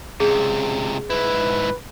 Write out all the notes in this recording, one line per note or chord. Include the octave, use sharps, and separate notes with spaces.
C#2 C3 G#4
G#2 E4 B4